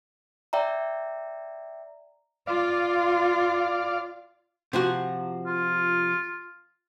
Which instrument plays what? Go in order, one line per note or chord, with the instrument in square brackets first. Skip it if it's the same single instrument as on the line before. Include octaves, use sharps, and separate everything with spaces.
[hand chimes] D5 E5 G5 A#5
[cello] F4 [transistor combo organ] D5 F5
[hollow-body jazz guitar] C3 F3 F#4
[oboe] F4